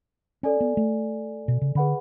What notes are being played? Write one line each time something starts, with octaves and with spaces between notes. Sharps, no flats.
C#4 A4 D5 G#5
B3
A3
B2
C#3
D3 G#4 B4 F#5 B5